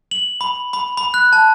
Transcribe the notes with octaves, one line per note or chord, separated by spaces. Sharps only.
F#7
B5
B5
B5
F#6
A5